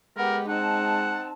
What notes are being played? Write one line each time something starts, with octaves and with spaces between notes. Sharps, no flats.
G#3 B3 G4 A#4
C4 D#4 F#5 A5